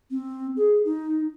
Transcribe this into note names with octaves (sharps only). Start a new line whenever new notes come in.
C4
G#4
D#4